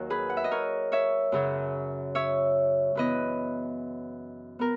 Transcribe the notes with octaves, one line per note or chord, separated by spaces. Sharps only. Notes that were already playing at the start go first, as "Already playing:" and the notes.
Already playing: D#2 D#3 F#3 F#4
G#4 B4
F#5
E5
D#5
A#4 C#5
C#5 E5
F#2 C#3 F#3
C#5 E5
F#2 E3 B3 B4 D#5
B3 A#4